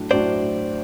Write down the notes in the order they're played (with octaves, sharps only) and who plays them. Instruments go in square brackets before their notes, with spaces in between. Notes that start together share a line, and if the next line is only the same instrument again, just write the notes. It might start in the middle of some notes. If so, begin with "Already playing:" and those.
Already playing: [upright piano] A2 F#3 A3 D4
[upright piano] A2 F#3 A3 D4 F#4 [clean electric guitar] C5 D5